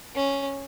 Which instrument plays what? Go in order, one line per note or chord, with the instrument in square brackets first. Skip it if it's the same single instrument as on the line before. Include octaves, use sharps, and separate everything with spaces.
[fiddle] C#4